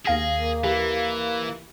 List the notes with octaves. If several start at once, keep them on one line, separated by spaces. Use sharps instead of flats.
D#2 G#4 F5 A#6
A#3
E3 G4